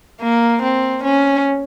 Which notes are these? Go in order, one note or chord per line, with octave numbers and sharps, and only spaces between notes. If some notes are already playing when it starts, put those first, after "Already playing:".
A#3
C4
C#4